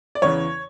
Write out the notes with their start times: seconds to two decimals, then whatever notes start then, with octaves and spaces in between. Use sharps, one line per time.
0.15 D5
0.22 E2 C#3 E3 C#5